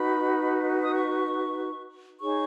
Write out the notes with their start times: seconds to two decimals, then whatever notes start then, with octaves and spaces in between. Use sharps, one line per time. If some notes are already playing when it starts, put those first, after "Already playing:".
Already playing: D#4 F#4 B4 B5
0.83 D#6
0.94 C#6
2.20 D#4 G#4 C#5 C#6